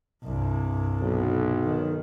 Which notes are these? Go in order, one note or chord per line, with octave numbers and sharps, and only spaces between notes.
C2 G2
B1
D#3